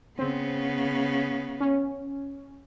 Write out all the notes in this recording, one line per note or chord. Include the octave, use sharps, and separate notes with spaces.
C#3 B3 C4
C#4